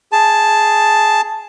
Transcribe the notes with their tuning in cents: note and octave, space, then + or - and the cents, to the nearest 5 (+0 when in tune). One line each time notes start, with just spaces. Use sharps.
G#4 +0 A5 +0